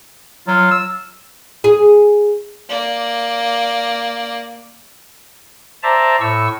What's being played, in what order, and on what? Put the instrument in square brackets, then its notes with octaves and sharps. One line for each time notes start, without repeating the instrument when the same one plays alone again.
[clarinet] F#3 [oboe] F4
[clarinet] E6
[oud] G#4
[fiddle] A#3 D5
[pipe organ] C5 D5 E5 A5 A#5
A2 C#6 E6